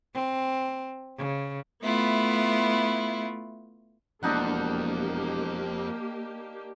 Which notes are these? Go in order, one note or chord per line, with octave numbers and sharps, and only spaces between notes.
C4
C#3
A3 B3 E4 F4
E1 F2 A#3 D4 D#4 G4 F#5